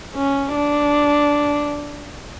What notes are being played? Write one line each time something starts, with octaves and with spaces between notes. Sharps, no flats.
C#4
D4